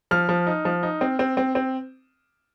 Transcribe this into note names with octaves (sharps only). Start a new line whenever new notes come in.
F3 F6
F3
D#4
F3
D#4
C4
C4
C4
C4